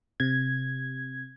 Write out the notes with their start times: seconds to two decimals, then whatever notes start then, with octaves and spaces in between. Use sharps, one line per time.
0.20 C3 G#6